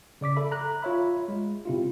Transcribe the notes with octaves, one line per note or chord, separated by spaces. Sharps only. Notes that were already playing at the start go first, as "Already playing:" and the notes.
C#3 D5 D6 B6
A4 E5 B5
A#5 F#6
F4 C#5 E5 B5
G#3
C3 E4 F4